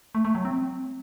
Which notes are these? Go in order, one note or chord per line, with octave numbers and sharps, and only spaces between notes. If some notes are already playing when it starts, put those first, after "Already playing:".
A3
A3
F#3
C4